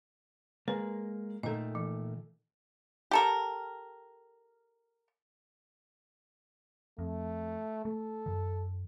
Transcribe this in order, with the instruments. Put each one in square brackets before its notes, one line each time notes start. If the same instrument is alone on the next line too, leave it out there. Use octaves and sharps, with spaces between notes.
[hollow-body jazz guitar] G#3 A#3 [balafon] B4
[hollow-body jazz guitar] A#2 D#3 A3 [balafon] A4 D#5
[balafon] E3
[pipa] G4 A4 A#4
[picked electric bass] F2 [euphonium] A3
[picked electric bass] A3 [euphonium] A4
[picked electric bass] F#2 D#3